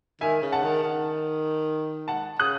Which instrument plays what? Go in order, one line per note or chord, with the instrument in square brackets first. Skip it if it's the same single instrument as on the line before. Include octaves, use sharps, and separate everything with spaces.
[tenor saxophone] D#3 [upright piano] E5 G#5
[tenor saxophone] C#3
[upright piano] F#5 A5
[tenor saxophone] D#3
D#3
[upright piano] F#5 A5
[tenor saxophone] C#3 [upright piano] D#6 F#6